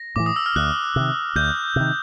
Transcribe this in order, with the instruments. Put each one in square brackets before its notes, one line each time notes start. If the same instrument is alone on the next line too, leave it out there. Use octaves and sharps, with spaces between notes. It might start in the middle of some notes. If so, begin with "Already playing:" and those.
Already playing: [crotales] A#6
[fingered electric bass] A2 E3 [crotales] D6
[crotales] D#6
E6
F6
[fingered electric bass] D2 [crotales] F#6
[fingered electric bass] C3 D#3
[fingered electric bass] D2 [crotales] G6
[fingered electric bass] C3 D#3